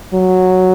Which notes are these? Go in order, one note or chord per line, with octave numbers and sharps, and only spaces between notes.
F#3